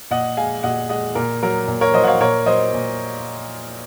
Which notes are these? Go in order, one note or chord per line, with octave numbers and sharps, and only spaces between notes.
A#2 D#5 F#5
G#3 F5 G#5
A#2 D#5 F#5
G#3 D#5 F#5
A#2 A#4
F#3 A#4
A#2
A#4 C#5
F#3 C5 D#5
F#5
C#5 F5
A#2 A#4 C#5
F#3 C5 D#5
A#2